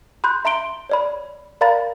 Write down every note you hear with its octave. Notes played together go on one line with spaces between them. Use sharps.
B5 C6 F#6 G6
E5 A#5 C6 D7 G7
C#5 D5 B5
A#4 D5 F5 A#5 B5 A6